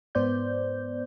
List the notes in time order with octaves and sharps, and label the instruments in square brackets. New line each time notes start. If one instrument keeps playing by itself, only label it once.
[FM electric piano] G#2 B3 C5 D5 G6